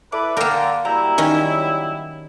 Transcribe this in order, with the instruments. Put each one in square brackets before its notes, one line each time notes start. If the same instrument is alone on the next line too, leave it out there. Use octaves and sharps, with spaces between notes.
[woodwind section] E4 A4 B4 [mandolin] D5
[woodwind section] D3 [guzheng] A#3 A#4 [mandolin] G5 A#5
[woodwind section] F#3 G3 E4 [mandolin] A#5 G6
[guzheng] D#3 C#4